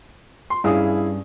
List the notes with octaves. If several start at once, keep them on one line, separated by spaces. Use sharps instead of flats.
C6
G2 C#4 E4 G#4 F5 D#6